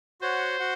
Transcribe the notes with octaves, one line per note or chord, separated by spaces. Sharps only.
F#4 C5 C#5 F#5
F#4 F#5